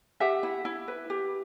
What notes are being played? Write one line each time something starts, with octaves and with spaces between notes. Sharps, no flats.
G4 E5 F#5
E4
E4
B4
G4